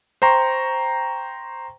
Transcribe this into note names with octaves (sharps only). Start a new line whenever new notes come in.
C5 G5 A#5 C6 C#6